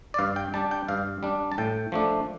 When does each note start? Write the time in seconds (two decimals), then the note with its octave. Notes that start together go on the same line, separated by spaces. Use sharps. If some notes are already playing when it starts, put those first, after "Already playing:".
0.14 D5
0.19 G2 F5
0.36 G5
0.54 G3 D4 A5
0.71 G5
0.88 G2 F5
1.23 G3 D4
1.52 A5
1.58 A2 G5
1.92 F3 A3 D4